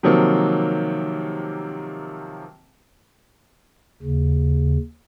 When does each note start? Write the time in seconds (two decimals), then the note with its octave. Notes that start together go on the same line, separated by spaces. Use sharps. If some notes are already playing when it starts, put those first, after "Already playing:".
0.03 C3 D#3 F3 F#3 A#3
4.02 D#2 C#3